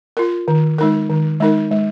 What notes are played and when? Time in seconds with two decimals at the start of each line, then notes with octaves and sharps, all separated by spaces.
0.17 F4 A#4
0.48 D#3
0.78 G#3 D#4 A#4
1.10 D#3
1.40 G#3 D#4 A#4
1.71 G#3